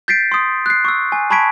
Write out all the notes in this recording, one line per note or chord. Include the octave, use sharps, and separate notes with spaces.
G6 A6 B6 C7 D7
C6 D#6
F#6 C7
C#6 E6
G#5
A5 B5 C#6 G#6 B6 D7